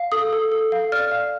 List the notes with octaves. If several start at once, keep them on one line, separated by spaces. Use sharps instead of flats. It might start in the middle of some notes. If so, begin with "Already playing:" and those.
Already playing: F5
A4 D#6
A4
A4
F5
D5 F6
F5